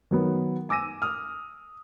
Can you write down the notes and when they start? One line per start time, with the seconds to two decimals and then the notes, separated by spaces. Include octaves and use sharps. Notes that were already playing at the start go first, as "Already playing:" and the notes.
0.11 D#3 F#3 B3
0.69 G#5 D6 E6 A#6 D#7
1.02 D#6 F6